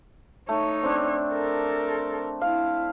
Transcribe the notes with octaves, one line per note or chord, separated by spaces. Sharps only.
A3 D#4 C#5
C4 D4
A4 A#4
E4 F5